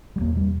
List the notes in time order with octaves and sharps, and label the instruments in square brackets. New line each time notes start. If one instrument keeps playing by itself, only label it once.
[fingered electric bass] G3
E2 B2 A#3
G3